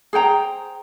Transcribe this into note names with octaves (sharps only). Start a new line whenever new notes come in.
G#4 C5 G5 A#5